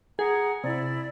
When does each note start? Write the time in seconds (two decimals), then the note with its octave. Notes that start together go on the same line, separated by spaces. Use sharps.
0.19 G#4 F#5 A#5 D#6
0.64 C3 E4 D5